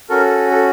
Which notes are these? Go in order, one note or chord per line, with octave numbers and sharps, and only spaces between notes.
C#4 F#4 A4 A#4
A4